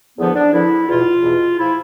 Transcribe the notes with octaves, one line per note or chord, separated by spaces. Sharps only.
E2 D3 F3 B3
D4
E2 D3 F3 E4
E2 B2 F4
E2 B2
F3 E4